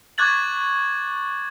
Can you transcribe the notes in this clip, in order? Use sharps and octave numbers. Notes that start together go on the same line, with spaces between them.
C#6 D6 F#6 G#6 A6 F#7